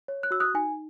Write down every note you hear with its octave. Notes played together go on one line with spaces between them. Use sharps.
C#5
F#6
F#4 E6
D#6 F#6
D#4 G#5